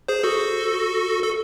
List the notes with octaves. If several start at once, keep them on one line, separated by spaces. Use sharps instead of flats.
G#4 C5
F#4 A4
A4